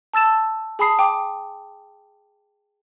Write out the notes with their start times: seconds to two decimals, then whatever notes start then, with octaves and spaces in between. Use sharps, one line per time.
0.14 A5 E6 A6 E7
0.79 G#4 G#5 A5 B5 D#6 C7
0.99 G5 D6